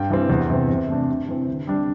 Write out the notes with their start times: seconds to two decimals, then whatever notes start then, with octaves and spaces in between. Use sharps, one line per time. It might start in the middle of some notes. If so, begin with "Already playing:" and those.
Already playing: G2 G5
0.10 E3 G3 C4
0.30 E2
0.50 C3 E3 C4
0.69 C3
0.89 A3 D4
1.09 C3
1.28 E3 C4
1.48 D3
1.67 G3 D4